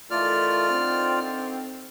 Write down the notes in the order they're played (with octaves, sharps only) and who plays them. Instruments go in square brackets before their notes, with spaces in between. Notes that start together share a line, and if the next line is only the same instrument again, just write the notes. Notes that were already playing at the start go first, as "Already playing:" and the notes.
[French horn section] D#3 E3 A3 [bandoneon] F4 D5 F6
[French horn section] D3 D#3 C4